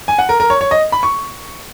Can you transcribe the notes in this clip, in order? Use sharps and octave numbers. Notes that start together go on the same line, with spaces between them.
G#5
F#5
A#4
A#4
C#5
C#5
D#5
B5
C#6